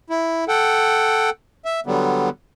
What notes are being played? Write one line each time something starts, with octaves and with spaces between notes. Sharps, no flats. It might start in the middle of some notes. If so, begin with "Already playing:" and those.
E4
A4 F#5 G5
E5
D3 F#3 G3 B3